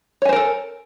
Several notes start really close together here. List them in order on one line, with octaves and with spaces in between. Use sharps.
C#5 G#5 C5 A#4 A4